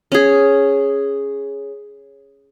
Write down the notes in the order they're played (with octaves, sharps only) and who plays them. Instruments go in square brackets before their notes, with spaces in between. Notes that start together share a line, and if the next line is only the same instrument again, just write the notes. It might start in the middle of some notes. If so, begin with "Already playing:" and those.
[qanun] C#4 G#4